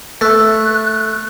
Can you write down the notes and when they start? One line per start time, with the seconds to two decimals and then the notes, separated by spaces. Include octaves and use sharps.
0.21 A3 F#6